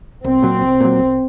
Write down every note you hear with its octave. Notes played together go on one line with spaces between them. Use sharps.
C2 C4
A#2 F#3
C2
A#2 F#3
C2